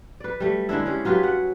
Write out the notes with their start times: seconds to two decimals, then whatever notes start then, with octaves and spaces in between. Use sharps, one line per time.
0.20 B4 D5
0.40 G3 A3
0.69 D3 G#3 D4 E4
0.86 G#3 C#4 G4
1.05 F#3 F4 G4 B4
1.23 F#5